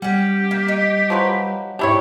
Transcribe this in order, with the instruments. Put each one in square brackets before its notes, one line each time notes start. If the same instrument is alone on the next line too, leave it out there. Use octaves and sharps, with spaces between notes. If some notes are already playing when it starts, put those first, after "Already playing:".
[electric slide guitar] G3 [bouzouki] C#4 F#5 [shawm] G4
[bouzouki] A#3
D#4
[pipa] F3 F#3 B4
[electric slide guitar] G#2 G4 [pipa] D4 E4 C#5